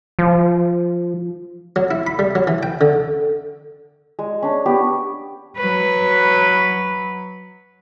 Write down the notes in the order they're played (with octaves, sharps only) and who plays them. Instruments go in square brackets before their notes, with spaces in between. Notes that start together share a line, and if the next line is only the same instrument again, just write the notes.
[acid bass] F3
[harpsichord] F#3
E4
B5
G3
F#3
E3
G5
D3
[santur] G#3
C#4 D4
B3 G4
[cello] F#3 B4